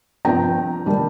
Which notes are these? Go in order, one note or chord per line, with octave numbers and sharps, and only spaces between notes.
G2 F3 C4 G5 A#5
D#3 G3 A#3 D4